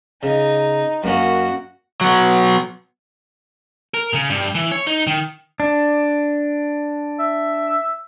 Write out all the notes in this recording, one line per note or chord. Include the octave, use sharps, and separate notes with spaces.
C#3 D#4
F#2 A#3 C#4 F#4
F#3 B3
A#4
C#3
G2
E3
C#5
D#4
D#3
D4
E5